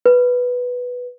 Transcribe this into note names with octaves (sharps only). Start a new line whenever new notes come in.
B4